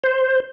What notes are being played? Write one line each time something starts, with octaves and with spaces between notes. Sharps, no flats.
C5